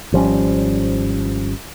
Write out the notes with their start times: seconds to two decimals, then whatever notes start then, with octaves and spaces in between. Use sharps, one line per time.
0.12 G#1 F3 G3 C#4